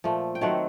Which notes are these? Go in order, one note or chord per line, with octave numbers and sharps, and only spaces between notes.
A#2 F3 A3
G5
D#3 F#3 A3 C4 F#5